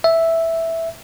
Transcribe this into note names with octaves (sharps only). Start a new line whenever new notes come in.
E5